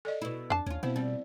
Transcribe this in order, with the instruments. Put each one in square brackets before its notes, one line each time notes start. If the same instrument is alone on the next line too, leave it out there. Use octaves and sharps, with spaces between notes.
[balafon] A4 D5 D#5
[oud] B2 E4
[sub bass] F2 [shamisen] D4 A5
[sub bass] D#2 [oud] C#4 F4
[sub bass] B2 [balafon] B3 C4 C5 [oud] E4
[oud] G3 [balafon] C4